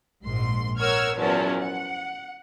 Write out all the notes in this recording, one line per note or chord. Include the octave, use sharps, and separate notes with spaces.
A#1 G#2 C6
A#4 C#5 F#5 E6 F6 G#6
E2 F3 F#3 C#4 A#4 A5
F#5